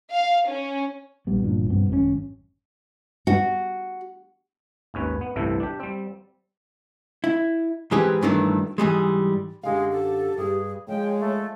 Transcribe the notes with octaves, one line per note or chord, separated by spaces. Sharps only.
F5
C#4
A#1 G3 B3
G1 A#2 F3 D4
G2 B2 B3 C4
G#1 F#2 C#3 C#4
F#4
G#1 D#2 C#4 B4
B3
G1 C2 A2 C3 E3 A4
D4 G4
G3 C4
E4
G#2 E3 C4 G4 G#4 B4
G2 D#3 E3 F#3 A3 D4
G#2 E3 G3 G#3
F#2 D3 G#3 G4 F5
A4
G2 G3 G#4
F3 G#3 C#5 G5
A3